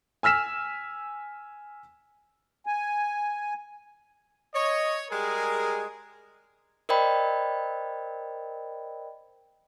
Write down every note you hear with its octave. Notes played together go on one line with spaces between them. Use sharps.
G#5 E6 F6 B6 E7
G#5
C#5 D#5
G3 G#3 G#4 A#4
A#4 C5 D5 D#5 G5 B5